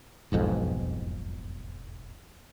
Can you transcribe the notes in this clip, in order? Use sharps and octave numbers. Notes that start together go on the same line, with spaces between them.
E1 B1 F2 G#2